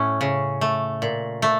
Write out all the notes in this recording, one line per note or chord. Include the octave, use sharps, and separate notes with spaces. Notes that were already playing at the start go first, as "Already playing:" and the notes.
Already playing: A2 C#4
C#3
A3
A#2
A3